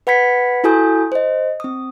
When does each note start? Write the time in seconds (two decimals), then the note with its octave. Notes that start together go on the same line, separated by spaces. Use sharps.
0.07 B4 F#5 B5 G#6 B6 C#7
0.64 E4 F#4 A4 G#5 D#6 G6
1.12 C5 D#5
1.60 C4 D#6